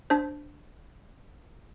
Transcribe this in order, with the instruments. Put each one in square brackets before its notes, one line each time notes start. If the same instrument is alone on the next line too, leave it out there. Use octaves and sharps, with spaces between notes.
[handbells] D4 C5